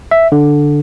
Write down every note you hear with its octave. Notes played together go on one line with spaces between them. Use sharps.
E5
D3